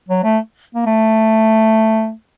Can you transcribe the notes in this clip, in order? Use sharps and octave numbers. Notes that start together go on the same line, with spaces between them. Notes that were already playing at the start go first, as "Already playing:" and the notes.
F#3
A3
A#3
A3